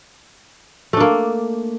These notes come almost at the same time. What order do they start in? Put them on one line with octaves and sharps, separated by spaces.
A3 D4 A#3